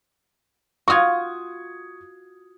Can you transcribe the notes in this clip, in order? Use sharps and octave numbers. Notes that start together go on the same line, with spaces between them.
F4 F#4 C#6 D#6 G#6